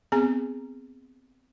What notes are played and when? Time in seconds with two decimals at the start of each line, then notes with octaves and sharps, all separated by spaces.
0.12 B3 C4 G#4 G#5 A#5